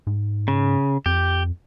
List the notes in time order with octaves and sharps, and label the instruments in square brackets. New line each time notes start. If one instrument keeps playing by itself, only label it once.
[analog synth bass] G#2
[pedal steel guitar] C#3
[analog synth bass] F2 [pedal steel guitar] G4